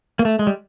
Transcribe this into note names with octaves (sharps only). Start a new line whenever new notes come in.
A#3
A3
G#3
G3